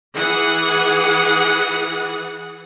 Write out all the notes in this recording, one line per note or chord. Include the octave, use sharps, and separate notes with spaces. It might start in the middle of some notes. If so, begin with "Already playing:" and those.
E3 G#4 F#5